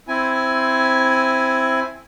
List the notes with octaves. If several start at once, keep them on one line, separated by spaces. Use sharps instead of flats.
C4 E4 G#5